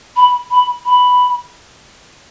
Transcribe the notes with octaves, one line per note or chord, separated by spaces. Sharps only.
B5
B5
B5